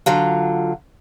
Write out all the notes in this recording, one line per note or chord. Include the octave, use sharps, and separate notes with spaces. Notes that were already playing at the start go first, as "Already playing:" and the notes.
D3 F#3 F4